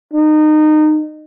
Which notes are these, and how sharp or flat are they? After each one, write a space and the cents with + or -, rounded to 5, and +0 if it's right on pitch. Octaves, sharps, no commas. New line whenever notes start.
D#4 -25